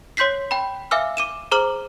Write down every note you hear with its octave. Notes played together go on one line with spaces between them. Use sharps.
C#5 C6 G6 B6 C7
G5 B5
E5 F5 G#5 D6 E6 F6
D6 D#7 E7
G#4 C5 A#5 D6 F6 F#7